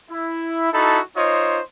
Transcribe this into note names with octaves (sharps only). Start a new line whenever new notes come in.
E4
D#4 E4 F#4 A4 A5 B5
D#4 F4 C5 C#5 D#5